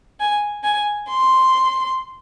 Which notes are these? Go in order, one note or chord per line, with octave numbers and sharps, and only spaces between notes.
G#5
G#5
C6